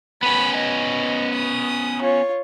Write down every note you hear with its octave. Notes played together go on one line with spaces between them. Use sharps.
B3 C#4 B5
D#5
D#6
F4 C#5